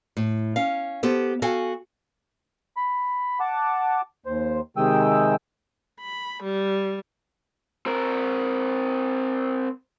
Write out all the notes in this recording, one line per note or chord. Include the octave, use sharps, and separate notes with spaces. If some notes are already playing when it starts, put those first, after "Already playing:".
A2
C#4 F5
B3 G4 A4 C5
F#4 A4 F5 G5 G#5
B5
F#5 A5 D6
D#2 C5
C3 D#3 G#3 G5 D#6 E6
B5
G3
C4 A#4